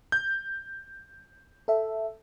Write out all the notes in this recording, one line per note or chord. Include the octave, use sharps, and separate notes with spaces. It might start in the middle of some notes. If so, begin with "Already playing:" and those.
G6
A4 E5